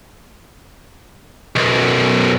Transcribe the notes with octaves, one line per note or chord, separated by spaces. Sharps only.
B1 F#2